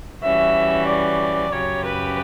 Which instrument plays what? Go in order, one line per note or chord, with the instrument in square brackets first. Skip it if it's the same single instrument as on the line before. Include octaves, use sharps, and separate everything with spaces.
[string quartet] E3 G3 C#4 F#4 [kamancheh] E5
[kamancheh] D5
[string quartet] F#2 C#3 F#3 C#4 G4 [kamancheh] C#5
[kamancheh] B4